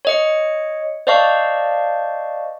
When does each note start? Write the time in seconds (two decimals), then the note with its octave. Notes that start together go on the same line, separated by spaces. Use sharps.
0.05 C#5 D#5 C#7
1.07 C5 D5 D#5 F5 A5 C#6